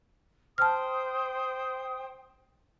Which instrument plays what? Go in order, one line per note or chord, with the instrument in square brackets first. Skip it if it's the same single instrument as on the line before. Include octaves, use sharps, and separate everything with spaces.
[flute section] C5 G5 D#6 [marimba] A5 F6